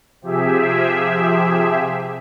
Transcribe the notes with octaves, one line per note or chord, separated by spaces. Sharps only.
C3 F3 G4 G#4 E5